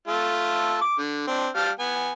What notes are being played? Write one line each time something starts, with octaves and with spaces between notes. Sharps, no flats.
A3 F4 A4
D6
D3
C4 D4
G3 F5 A5
B3 G#5